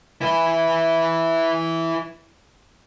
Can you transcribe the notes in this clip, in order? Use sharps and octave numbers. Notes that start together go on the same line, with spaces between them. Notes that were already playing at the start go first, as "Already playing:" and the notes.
E4 B4